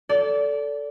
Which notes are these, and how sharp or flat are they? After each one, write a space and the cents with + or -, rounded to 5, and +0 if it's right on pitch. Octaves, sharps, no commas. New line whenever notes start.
A4 +0 D5 -25